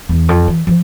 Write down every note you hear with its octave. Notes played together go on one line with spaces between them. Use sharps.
E2
F2
E3
F3